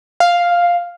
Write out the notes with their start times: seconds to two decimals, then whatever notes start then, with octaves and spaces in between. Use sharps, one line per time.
0.20 F5